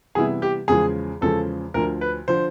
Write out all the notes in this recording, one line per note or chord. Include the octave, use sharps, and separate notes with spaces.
C3 E3 G3 B3 E4 G#4
G4
E2 C#3 F3 G#3 G#4
E2 C#3 F3 G#3 A4
D2 D3 F3 A#4
B4
D3 F3 C5